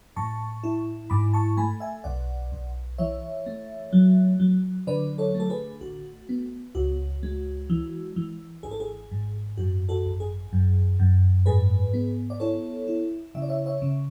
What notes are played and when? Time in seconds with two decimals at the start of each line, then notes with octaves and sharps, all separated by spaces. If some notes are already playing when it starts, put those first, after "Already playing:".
0.16 A2 A5 C#6
0.63 E4
1.10 G#2 B5 D6
1.33 A5 C#6
1.57 A3 G#5 B5
1.80 E5 G#5
2.04 B1 D5 F#5
2.52 B1
2.98 E3 C#5 E5
3.46 A3
3.93 F#3
4.40 F#3
4.87 D3 B4 D5
5.18 A4 C#5
5.35 A3
5.40 A4
5.50 G#4 B4
5.81 A1 F#4
6.29 B3
6.75 C#2 F#4
7.23 G#3
7.70 E3
8.16 E3
8.63 G#1 G#4
8.71 A4
8.80 G#4
9.11 G#2
9.57 F#2 F#4
9.89 F#4 A4
10.05 G#1
10.20 G#4
10.53 F#2
11.00 F#2
11.46 G#2 G#4 B4
11.94 B3
12.30 D5
12.40 E4 A4 C#5
12.88 E4
13.35 C#3 E5
13.42 D5
13.49 C#5 E5
13.66 C#5 E5
13.82 C#3